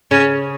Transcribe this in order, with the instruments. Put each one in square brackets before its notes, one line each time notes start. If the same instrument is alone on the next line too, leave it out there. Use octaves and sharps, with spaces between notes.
[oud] C#3 [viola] C#4